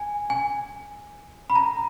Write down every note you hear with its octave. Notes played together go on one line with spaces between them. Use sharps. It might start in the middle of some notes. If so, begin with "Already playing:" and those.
Already playing: G#5
G#5
B5
A#5